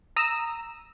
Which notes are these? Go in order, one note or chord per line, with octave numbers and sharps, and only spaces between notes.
A#5 D#6 E6